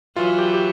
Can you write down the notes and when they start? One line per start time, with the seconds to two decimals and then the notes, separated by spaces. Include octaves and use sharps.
0.16 E3 F#3 F4
0.38 G4
0.54 G4